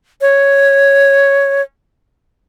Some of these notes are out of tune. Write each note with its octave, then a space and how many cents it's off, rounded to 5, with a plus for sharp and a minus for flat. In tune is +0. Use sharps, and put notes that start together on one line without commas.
C#5 +0